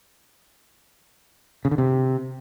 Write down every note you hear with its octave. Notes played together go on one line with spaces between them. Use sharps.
C#3
D3
C3